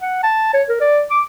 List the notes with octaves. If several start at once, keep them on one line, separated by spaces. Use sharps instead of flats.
F#5
A5
C#5
A#4
D5
D6